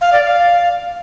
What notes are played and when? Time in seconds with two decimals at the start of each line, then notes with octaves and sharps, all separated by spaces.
0.01 F5
0.13 D5
0.24 F5